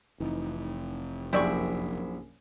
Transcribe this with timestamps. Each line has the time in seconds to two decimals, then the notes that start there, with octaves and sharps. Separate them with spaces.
0.20 F1 E3 D#4
1.33 A#1 F#2 C3 E4 G4 D5 G#5 C#6